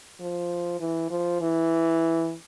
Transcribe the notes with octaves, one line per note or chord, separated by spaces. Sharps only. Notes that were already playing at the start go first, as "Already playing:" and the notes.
F3
E3
F3
E3